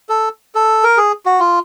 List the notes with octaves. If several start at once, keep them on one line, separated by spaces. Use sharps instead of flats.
A4
A4
A#4
G#4
F#4
F4